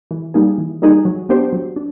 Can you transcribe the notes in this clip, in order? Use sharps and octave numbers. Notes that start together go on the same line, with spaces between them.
E3
G3 A#3 D#4 G#4
E3
G3 A#3 D#4 G#4
F#3
B3 D4 G4 C5
F#3
D4